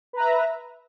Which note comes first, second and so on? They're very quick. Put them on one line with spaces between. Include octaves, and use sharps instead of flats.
B4 A#5 E5